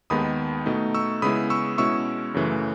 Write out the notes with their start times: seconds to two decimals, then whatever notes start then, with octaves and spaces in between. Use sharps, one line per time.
0.10 D#2 D#3 G#3 B3 B5 D#6
0.66 B2 A3 D#4
0.94 C#6 E6
1.22 C#3 G#3 B3 E4 B5 D#6
1.50 C#6 E6
1.78 B2 G#3 C#4 E4 C#6 E6
2.34 F#2 C#3 E3 A3